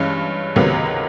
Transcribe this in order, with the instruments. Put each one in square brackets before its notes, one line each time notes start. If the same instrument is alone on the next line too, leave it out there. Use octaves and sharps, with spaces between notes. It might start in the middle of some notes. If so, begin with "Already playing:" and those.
Already playing: [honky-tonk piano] G2 E3 G#3 C#4
C#2 C3 D#3 F#3 B3